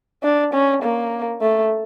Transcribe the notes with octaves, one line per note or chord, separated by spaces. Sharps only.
D4
C#4
A#3
A3